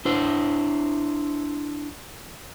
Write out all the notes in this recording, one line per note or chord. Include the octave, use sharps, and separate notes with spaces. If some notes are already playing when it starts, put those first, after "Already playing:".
D4 E4 C5